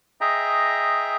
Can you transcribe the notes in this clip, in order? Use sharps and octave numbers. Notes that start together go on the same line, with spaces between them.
G#4 D#5 E5 G5 A#5